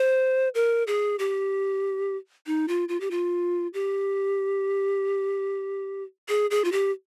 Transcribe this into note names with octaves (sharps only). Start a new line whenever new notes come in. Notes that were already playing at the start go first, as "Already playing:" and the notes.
Already playing: C5
A#4
G#4
G4
D#4
F4
F4
G4
F4
G4
G#4
G#4
F4
G4